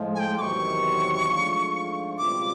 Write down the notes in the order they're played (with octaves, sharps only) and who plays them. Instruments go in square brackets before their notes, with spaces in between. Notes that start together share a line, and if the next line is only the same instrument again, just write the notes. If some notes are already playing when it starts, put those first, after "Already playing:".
Already playing: [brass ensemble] A2 F3 G#3
[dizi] G#5
G5
[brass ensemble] E2 C3 D#3 F#3 [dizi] C#6 D6
[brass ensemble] G#2 F3 A3 D4 F4
[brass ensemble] C#2 B2 G3 C4 F4 [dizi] D6